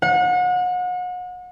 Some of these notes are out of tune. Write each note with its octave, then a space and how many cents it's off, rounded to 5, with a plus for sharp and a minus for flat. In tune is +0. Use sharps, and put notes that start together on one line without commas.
F#5 -35